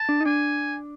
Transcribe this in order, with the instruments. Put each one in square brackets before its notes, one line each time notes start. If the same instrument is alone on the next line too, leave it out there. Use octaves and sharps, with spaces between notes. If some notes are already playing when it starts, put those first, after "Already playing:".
Already playing: [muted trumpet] A5
[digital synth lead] D4
D#4
[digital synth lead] D4 [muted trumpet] G#5